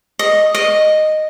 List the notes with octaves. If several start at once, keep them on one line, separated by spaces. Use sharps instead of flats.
D#5
D#5